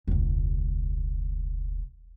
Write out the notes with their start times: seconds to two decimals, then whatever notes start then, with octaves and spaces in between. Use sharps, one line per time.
0.07 E1 C#2